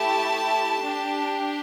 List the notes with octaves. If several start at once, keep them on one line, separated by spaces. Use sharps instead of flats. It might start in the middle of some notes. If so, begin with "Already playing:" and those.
Already playing: A3 E4 G4 A5
D4 G4